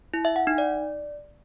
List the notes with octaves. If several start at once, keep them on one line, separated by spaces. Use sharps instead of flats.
E4
E5
F#5
D#4
D5